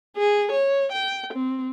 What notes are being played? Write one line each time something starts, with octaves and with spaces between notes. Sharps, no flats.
G#4
C#5
G5
C4